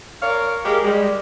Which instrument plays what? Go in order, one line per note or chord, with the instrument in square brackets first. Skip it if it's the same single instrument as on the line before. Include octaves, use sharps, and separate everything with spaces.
[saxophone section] A#4 C#5 D5 F5
G#3 G4 A#4
G3 G#3